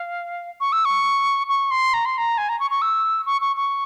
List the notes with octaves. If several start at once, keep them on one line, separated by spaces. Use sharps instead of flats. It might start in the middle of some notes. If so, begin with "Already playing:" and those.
Already playing: F5
C#6
E6
C#6
C#6
C6
A#5
C6
A#5
G#5
A#5
C#6
C#6
E6
C#6
C#6
C#6